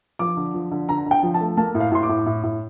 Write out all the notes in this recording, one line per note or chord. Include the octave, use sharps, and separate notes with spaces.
F3 D6
D3
F3
D3
D3 A#5
D3
G5
F3
A5
A3
A#3 A5
A2
F5
A2 C6
D6
A2
A2
A2